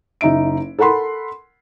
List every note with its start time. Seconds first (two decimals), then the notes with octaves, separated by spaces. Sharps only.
0.21 F#1 D#4 E5 D7
0.79 A4 A#4 F#5 B5 C6